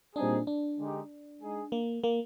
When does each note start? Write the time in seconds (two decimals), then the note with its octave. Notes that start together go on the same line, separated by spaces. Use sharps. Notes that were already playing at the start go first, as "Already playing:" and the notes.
0.16 A#2 G3 C4 D4 D#4 G#4
0.47 D4
0.79 D3 G#3 D#4 G4
1.40 G#3 D#4 G#4 D#5
1.72 A#3
2.04 A#3